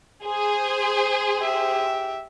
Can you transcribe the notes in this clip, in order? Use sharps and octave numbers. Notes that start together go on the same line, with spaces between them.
G#4 C5
G4 E5